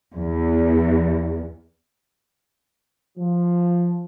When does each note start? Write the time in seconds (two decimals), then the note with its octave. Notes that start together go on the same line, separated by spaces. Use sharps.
0.16 E2
3.18 F3